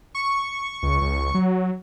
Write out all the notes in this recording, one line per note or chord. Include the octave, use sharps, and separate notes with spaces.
C#6
C#2
C#2
F#3